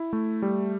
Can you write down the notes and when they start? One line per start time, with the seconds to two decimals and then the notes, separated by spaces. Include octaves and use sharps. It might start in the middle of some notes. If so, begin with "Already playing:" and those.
Already playing: E4
0.13 A3
0.42 G3